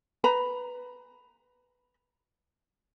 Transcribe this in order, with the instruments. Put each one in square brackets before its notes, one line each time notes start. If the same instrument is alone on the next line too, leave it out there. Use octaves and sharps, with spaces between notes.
[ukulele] B4 A#5 B5